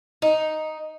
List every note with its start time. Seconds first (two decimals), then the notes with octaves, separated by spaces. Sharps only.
0.22 D#4